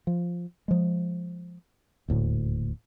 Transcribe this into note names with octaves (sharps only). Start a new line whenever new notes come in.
F3
F3 G#3
D#1 D2 A2